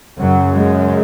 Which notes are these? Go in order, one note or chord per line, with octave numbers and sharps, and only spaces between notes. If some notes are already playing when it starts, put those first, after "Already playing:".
F#2 C#3 F#3
G#3